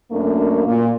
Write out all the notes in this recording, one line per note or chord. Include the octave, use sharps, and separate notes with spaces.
F#2 A3 A#3 D4 A#4
A#2